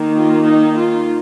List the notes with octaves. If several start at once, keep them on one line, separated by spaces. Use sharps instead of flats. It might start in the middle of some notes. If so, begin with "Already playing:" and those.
Already playing: D#3 A#3
F4
D#4
F4